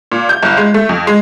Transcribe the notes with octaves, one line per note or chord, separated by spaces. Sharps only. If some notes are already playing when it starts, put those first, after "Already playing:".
A#2
G6
G1
G#3
A3
F2
G#3